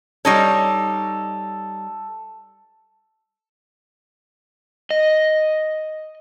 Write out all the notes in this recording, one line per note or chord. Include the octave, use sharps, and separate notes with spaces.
G3 D#4 A4 C#5
D#5